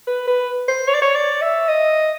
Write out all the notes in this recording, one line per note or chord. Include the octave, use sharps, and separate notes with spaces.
B4
B4
C5
C#5
D5
C#5
D5
E5
D#5